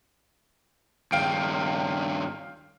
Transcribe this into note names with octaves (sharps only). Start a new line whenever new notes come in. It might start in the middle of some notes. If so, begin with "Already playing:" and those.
G2 D#3 F5 G5 D7